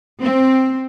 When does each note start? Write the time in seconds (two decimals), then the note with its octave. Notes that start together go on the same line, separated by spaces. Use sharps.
0.22 C4